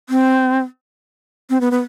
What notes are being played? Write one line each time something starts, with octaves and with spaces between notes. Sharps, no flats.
C4
C4
B3
B3